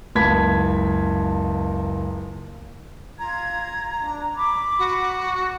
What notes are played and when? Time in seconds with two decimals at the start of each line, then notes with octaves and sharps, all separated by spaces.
0.15 F#1 C#2 A5 B5 G#6 B6
3.19 F4 A#5 G#6
3.99 D4
4.36 B5 D6
4.79 F#4